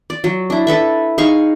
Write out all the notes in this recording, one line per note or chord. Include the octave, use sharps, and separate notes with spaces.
D5
F#3
D4 E4
E4 A4 B4 E5
D#4 G#4 F5 C#6